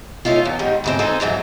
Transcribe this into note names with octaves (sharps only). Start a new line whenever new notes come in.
A3 C#4 D#4 F4
E2
G#2 D#3 G3
D2 G#2 C4
D#4 G#4 A4 C5
F2 G#2 E3 F#3